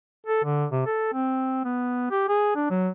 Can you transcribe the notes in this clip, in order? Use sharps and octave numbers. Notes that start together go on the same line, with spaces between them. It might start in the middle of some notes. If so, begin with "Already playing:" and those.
A4
D3
C3
A4
C4
B3
G4
G#4
D4
F#3